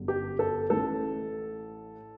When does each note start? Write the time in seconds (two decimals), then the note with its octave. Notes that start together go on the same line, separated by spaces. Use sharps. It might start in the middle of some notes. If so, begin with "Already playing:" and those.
Already playing: G1 F#2 D3 G3
0.08 G4
0.39 A4
0.70 A1 A2 E3 A4